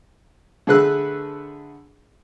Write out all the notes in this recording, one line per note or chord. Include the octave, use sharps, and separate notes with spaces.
D3 A3 G#4 B4 E6 F#6